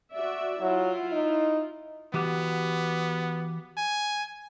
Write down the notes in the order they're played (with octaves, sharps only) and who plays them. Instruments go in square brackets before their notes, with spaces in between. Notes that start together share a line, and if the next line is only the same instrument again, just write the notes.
[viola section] F#4 D5 E5
[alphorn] F#3 [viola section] E4 F4
[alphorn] D#4
[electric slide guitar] E3 F#4 G4 [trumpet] B3
[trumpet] G#5